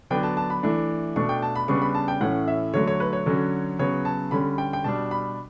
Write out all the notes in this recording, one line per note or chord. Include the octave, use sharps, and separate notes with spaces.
D3 F#3 B3 D4 G5
A5
A5
B5
E3 A3 D4
B2 A3 D4 C#6
G5
A5
B5
C#3 G3 B3 D4 C#6
B5
A5
G5
A2 E3 A3 C#4 F#5
E5
D3 F#3 A3 C#5
C#5
B4
C#5
D3 F#3 C#4
C#3 F#3 B3 C#5
A5
D3 G3 C#4 B5
G5
G5
B2 G3 D4 A5
B5